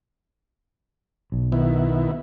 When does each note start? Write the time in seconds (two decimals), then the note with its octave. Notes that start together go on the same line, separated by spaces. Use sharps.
1.32 B1
1.52 D#3 B3 E4